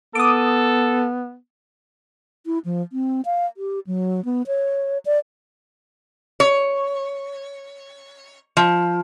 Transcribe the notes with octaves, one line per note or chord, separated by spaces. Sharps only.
B3 A4 D6 D#6
E4
F3
C4
F5
G4
F#3
B3
C#5
D5
C#5
F3